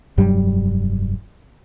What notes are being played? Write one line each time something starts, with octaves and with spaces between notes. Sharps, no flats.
F1 G2 F#3 G3